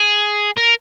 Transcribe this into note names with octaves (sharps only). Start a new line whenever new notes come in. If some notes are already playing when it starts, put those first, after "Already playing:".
Already playing: G#4
A#4